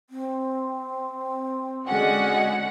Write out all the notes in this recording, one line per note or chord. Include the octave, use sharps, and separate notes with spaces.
C4
D3 G#3 C#4 F#4 D#5 F#5